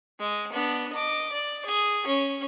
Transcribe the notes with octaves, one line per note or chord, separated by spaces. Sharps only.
G#3
B3 D4
D#5 D6
D5
G#4
C#4